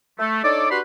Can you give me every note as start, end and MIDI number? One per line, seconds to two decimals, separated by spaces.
0.19 0.43 57
0.44 0.67 62
0.44 0.67 63
0.44 0.67 69
0.44 0.67 73
0.44 0.67 74
0.70 0.79 62
0.70 0.79 66
0.70 0.79 67
0.70 0.79 71
0.70 0.79 83
0.70 0.79 84